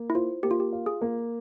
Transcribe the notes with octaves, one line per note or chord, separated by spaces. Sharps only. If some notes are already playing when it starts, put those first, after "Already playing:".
Already playing: A#3
E4
F4 C5
A#3 G4
F4
G4
F4
G#4
A#3